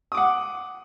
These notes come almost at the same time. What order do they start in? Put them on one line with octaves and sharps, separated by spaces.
D#6 D6 F#5